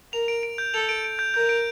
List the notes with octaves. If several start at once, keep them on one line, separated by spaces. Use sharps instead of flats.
A#4 F7
D7
D7
G6
A4 F7
D7
D7
G6
A#4 G6
D7